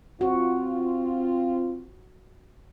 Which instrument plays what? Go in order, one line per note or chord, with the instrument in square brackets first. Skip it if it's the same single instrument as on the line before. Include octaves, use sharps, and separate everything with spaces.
[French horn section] C4 F4 [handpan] F#4